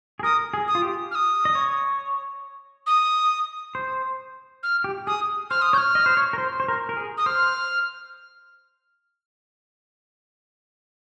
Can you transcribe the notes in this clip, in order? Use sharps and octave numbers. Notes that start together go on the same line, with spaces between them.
G#4
A#4 D#6
G#4
D#6
F4
G4
F6
D#6
D#5
C#5
D#6
C5
F6
G4
G#4 D#6
C5 F6
D#6
C#5 G6
F6
D#5
C5
C#5
A#4
C5
C5
A#4
A#4
G#4
D#6
C5 F6